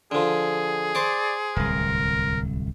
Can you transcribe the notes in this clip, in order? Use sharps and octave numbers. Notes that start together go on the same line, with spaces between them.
D3 F3 G#4
C5 D5 C#6 D6
D1 C2 A#4